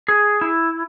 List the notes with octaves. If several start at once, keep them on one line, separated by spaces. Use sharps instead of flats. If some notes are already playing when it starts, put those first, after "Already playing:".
G#4
E4